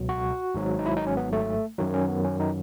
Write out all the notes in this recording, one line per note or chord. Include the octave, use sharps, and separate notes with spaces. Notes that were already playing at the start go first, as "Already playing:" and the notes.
Already playing: C#2 B2 F#3
F#4
G#1 G#2 F#3
D#4
E4
D#4
C#4
B3
A3
F#2 D#3 F#3
C#4
B3
C#4
D#4